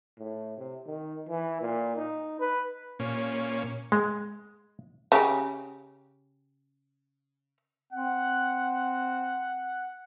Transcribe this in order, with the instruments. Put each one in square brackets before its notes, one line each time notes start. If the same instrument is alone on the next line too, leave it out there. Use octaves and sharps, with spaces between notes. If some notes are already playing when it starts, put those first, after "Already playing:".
[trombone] A2
C3
D#3
E3
A#2
D#4
B4
[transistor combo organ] A#2 C#4
[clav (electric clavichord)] G#3
[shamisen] C#3 G4
[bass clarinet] C4 [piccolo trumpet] F#5